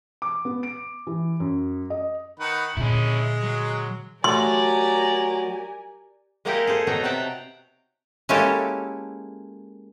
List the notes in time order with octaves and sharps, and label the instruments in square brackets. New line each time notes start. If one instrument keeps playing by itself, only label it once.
[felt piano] D6
B3
D7
E3
F#2
D#5
[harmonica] D#3 B4 F#5
[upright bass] A#2 D3 [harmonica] G#3 [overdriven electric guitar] C#4 E4
[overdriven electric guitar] F#3
[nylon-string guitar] F#3 A3 [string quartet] G4 A#4 G#5 [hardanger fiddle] D5 A#5 [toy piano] C6
[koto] G#3 A#3 D#4 E4 G4 A#4
G#4 A4 C5
B2 F#3 B3 D#4 G5 A#5
C3 F#3 F#5 G5 A5 A#5
G#3 A#3 C#4 E4 G4 A4